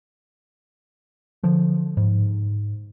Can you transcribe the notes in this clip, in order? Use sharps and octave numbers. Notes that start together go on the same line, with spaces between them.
D3 F3
G#2